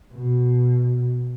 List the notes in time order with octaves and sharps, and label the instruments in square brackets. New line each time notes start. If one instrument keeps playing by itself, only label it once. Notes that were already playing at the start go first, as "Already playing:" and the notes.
[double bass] B2